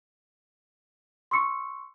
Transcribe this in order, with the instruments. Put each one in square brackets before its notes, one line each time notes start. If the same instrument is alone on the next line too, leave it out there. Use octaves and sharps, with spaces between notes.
[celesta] C6 C#6 E6 C#7